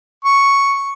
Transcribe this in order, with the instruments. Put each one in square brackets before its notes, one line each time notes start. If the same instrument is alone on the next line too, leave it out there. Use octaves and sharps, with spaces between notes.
[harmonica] C#6